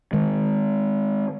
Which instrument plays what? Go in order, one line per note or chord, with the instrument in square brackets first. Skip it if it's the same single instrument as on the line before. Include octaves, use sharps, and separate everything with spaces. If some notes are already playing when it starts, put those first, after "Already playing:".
[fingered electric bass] D#3 G#3